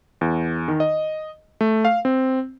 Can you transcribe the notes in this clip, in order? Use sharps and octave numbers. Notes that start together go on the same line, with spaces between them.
E2
D#3
D#5
A3
F5
C4